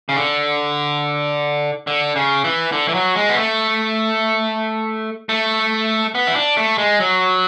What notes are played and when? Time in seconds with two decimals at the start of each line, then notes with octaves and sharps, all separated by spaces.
0.09 C#3
0.16 D3
1.87 D3
2.16 C#3
2.44 E3
2.72 D3
2.88 E3
2.94 F#3
3.15 G#3
3.29 B3
3.37 A3
5.29 A3
6.15 B3
6.27 E4
6.36 D4
6.57 A3
6.78 G#3
7.00 F#3